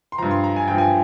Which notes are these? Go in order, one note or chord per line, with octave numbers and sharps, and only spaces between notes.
C6
G2 F3 A#5
C6
A#5
G#5
G2 F3 G5
G#5